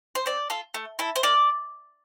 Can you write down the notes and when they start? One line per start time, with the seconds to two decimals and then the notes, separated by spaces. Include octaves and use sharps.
0.15 C5
0.26 C4 D5
0.50 F4 A4
0.74 A3
0.99 E4 A4
1.16 C5
1.23 A#3 D5